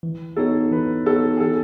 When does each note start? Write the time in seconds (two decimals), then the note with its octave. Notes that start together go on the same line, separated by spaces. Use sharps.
0.03 E3
0.36 B3 D#4 F#4 A4 C#5
0.71 E3 B4
1.06 B3 D#4 F#4 A4 C#5
1.37 G#4
1.40 E3 A4